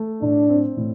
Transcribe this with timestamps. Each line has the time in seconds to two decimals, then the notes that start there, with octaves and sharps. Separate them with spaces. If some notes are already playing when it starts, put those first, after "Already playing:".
Already playing: A3
0.22 A2 D4
0.49 C4
0.77 A2